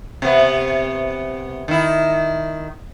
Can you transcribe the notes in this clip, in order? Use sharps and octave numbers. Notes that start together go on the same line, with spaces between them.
C3 B3
D#3 E4